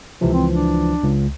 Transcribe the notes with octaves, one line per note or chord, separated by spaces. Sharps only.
C#2 C3 E3 F3
C4
D4
C#2